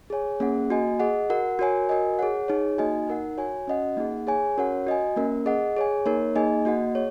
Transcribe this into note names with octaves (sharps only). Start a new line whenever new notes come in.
G#4 C#5 G#5
A#3 C#4 G#4 F#5
A#3 F#4 D#5 G#5
G#4 D#5 F#5
F#4 A#4 F#5
F#4 A#4 C#5 G#5
F#4 A#4 D#5 G#5
G#4 C#5 F#5
D#4 G#4 C#5
A#3 D#4 F#4 D#5 G#5
D#4 A#4 F#5
F#4 C#5 G#5
C#4 F#4 D#5 F#5
A#3 D#4 G#4 F#5
G#4 C#5 G#5
C#4 F#4 A#4 C#5 F#5
F#4 D#5 G#5
A#3 C#4 A#4
G#4 D#5 F#5
G#4 C#5 G#5
A#3 D#4 A#4 C#5
A#3 D#4 G#4 D#5 G#5
A#3 F#4 D#5 F#5
G#4 C#5